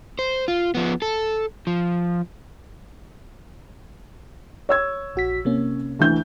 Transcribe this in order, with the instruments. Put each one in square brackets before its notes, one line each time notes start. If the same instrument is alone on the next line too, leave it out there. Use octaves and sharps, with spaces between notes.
[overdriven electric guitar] C5
F4
F3 B3
A4
F3
[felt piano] C#5 E6 G#6
[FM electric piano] A#1 F#4 B6
C3 A#3 C#4
[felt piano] D2 E3 G6